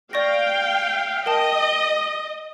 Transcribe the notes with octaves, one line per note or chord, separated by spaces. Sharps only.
D5 F5 G5 C#6 A#6
A#4 D#5 G5 A5